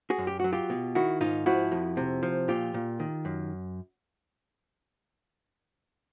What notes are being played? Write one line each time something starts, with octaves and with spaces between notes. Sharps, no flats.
F#4 G#4
F#2
G4
F#3 F#4
F4 G4
B2
D#3 E4 F#4
G#2 D#4 F4
F3 E4 F#4
F2
C3
F3
A#2 F4 G4
A#2
D#3
F#2